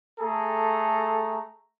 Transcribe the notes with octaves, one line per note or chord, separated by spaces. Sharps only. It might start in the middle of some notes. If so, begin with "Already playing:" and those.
A3 G#4 A4 A#5